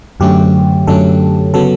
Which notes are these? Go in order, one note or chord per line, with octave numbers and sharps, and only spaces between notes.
F#2 D3 F#3 A3 C#4 G4
F#2 D3 F#3 A3 C#4 A4
C#3 F#3 B3 A4